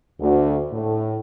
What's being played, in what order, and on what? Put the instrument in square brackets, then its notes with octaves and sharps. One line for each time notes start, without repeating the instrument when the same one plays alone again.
[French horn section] D2
A2